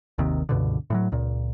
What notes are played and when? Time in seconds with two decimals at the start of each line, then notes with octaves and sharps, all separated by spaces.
0.18 G#1 D#2 C3 D#3
0.49 C#2 G2 B2 D3
0.90 A2 F3 F#3
1.12 C#2 A#2